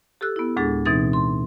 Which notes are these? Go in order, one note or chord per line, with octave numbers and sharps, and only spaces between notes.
G4 A4 E6 F#6
B3 E4
D2 A2 G#3 D4 G#4 A6
B2 E3 C4 D#4 A6
C6